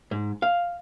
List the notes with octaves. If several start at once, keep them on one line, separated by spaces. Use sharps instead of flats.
G#2
F5